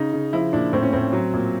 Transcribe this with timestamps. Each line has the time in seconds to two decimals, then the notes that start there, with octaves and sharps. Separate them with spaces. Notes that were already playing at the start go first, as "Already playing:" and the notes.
Already playing: C#3 D#4
0.13 C#3
0.33 F3 E4
0.53 A#2 D4
0.73 A2 C4
0.83 C#4
0.93 A2 C4
1.13 F#3
1.33 A#2